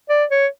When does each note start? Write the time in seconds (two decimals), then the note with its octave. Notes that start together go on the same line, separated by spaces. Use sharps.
0.09 D5
0.31 C#5